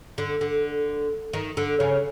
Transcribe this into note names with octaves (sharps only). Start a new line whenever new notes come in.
D3
D3
D#3
D3
C#3